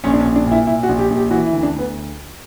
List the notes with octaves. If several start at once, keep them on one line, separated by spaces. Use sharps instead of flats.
A#1 C#4
D4
C#4
A#1
D4
A#2
E4
A#2 E4
F#4
A#1
G4
A#1
G4
E3 F#4
E4
D2
D4
D2
B3